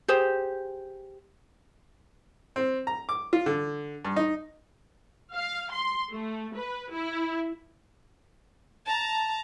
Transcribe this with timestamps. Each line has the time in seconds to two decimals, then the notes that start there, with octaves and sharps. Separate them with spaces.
0.08 G4 G#4 C5
2.56 C4
2.87 A#5
3.09 D6
3.33 F4
3.46 D3
4.05 G2
4.16 D#4
5.35 F5
5.72 C6
6.11 A3
6.55 B4
6.92 E4
8.86 A5 A#5